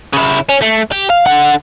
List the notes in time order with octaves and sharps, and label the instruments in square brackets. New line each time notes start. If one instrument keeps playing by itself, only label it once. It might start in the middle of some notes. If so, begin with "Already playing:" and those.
[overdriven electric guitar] C#3 E4
C#4
A3
G4
F5
D3 F#5